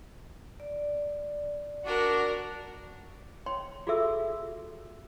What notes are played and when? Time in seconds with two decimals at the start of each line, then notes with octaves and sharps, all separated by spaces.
0.60 D5
1.86 D4 F#4 A#4
3.46 C#5 G5 C6
3.87 F4 F#4 G#4 A4 E5 E6